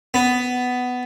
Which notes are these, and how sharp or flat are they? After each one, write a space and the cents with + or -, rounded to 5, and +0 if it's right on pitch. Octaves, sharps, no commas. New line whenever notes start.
B3 +10